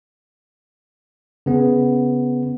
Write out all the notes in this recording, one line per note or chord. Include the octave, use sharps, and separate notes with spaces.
C#3 B3